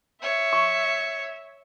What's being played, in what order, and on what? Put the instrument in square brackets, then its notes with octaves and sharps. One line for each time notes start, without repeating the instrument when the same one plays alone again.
[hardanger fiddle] C#5 [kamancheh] E5
[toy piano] C#6